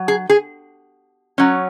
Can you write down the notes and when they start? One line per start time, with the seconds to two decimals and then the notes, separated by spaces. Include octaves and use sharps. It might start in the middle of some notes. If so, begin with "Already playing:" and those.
Already playing: F#3
0.08 G#4
0.29 G#4
1.38 F#3 C#4